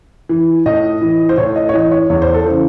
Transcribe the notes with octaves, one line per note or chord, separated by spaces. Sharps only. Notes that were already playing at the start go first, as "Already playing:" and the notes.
E3
A2 D#5
E3
C5
A2 C#5
D#5
C#5
E3 D#5
C#5
E2 C#5
C5
A4
C#3 E3 C5